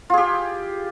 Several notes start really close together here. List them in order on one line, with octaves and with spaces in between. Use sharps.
F4 G#4 G4